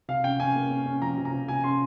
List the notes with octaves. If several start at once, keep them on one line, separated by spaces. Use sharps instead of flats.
C3 F5
C#4 G5
C#4 G#5
A#3
C#4
C#4
F3 A#5
C3
A#5
C3
C3 G#5
C#4 C6